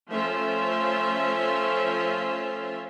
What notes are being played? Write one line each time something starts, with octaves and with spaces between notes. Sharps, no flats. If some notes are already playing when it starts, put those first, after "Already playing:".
F3 A3 C#4 F4 E5 C6